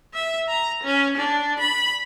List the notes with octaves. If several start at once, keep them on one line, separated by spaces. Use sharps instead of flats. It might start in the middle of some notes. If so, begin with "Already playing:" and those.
E5
A#5
C#4
D4
B5